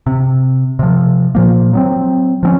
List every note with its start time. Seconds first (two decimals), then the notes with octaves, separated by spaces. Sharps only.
0.07 C3
0.79 C3 F3
1.35 A#2 F3 A#3
1.73 F#3 B3 C4
2.43 F3 C4 C#4